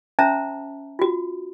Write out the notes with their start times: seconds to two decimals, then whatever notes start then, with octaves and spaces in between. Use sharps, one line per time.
0.19 C#4 C5 E5 A5 A#5
0.99 F4 F#4